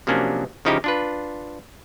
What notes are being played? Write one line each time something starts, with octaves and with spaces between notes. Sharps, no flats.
C3 F3 F#3 A#3 C#4 D4
C#3 F3 D#4 E4 G4
D4 F4 B4